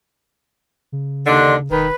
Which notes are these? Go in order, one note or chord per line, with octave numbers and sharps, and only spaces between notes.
C#3
D#2 D3 D4 D#5 C6 F#6
E1 D#3 B4